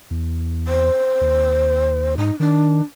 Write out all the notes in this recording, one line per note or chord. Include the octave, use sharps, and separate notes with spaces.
E2
C5
D#2
G#2 D#4
D#3 D4